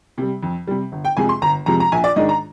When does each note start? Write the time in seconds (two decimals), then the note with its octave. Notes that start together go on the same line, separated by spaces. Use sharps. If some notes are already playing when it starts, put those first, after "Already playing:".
0.18 C3 G3
0.43 F2
0.67 C3 G3
0.92 G1
1.05 G5
1.17 F2 C3 F3 G#3 G#5
1.29 C6
1.42 G1 A#5
1.66 F2 C3 F3 G#3 A#5
1.80 A#5
1.92 A#1 G#5
2.04 D5
2.16 G#2 D#3 G#3 D4 D#5
2.29 A#5